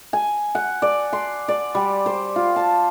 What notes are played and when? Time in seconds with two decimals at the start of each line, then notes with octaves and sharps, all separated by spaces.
0.13 G#5
0.55 F#5
0.82 D5
1.13 C6
1.48 D5
1.75 G3
2.06 C5
2.36 F4
2.56 A5